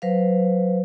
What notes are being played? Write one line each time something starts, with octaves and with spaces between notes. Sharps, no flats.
F#3 B4 C5 F5